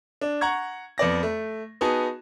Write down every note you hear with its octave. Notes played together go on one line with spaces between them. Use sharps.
D4
F#5 A#5 C#6 G#6
F2 B3 D5 A#6
A3
B3 D#4 F#4 G#4 A5